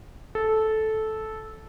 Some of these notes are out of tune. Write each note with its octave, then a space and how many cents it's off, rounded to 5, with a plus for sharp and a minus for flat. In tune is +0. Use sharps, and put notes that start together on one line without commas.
A4 -10